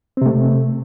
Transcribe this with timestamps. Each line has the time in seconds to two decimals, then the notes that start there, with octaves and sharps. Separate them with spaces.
0.17 C4
0.22 C3
0.26 A3